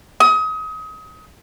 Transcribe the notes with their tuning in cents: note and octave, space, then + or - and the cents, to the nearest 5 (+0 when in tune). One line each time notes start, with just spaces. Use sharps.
D#6 +30